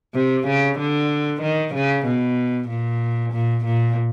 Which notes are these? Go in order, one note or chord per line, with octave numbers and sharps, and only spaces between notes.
C3
C#3
D3
D#3
C#3
B2
A#2
A#2
A#2